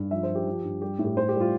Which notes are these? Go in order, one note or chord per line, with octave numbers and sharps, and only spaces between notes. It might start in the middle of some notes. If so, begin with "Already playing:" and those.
Already playing: G2
F3 E5
C5
F3
G4
F3
G2
G3 G4
A2
G4
A2 C5
G4
G3
F4